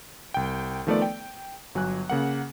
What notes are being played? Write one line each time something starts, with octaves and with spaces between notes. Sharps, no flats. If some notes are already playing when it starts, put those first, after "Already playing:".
C2 G5
D#3 F3 A3 B3 A4 D5
G5
G1 F#3 G#5 F#6
C#3 A#3 F#5